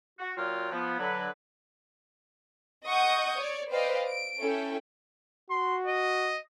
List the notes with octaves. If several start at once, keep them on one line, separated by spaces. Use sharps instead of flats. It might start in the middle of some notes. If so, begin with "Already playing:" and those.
F#4
A#2 F#3 F4 G5 F6
F3 B3
D3 F#3 B4
D#5 F#5 C#6 D#6 G6
C#5 D5
B4 C5 D5 D#5 F5 G5
D7
C#4 E4 A4 G5
F#4 C6
D#5